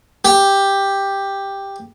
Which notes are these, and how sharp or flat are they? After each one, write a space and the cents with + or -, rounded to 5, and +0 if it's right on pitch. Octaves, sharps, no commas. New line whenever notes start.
G4 +5